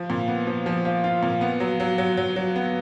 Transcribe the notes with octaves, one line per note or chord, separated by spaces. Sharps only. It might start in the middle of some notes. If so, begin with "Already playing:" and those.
Already playing: F3
A#2
B3
F3
F3
F3
F4
A#2
B3
F#3
F#3
F#3
F#3
F#3
B3